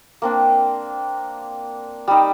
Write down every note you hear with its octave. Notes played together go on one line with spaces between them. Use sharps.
A#3 C4 D4
G3 D#4